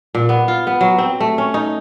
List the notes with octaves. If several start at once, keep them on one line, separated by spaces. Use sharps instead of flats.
A#2
B3
F4
B3
F#3
C4
A3
C#4
D#4